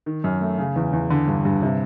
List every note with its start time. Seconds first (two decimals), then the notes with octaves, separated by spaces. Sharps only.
0.06 D#3
0.24 F#2
0.41 A3
0.58 C#3
0.76 E2
0.93 E2
1.10 D3
1.28 G2
1.45 G2
1.62 C3